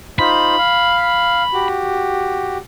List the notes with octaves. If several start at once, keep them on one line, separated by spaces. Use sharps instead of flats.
D#4 F4 C5 B5
F5
F#4 G4